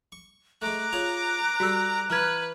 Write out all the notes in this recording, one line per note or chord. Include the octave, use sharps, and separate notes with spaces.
C#6
G#3 A3 A#5 D6 F#6
F4 G#4 C#5 F7
G3 F#4 G4 A4 E6
E3 B4 A#5 F6 G#6